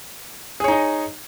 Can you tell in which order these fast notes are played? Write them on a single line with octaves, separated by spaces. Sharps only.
G#4 C#5 D#4 D#5